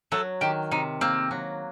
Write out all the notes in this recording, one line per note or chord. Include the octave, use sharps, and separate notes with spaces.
F#3 A3 A4
D#3 G4
C3 D#4
A#3 C4
F#3